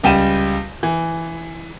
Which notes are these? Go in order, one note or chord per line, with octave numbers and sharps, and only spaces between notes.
C#2 G3 G5 D#7 E7
E3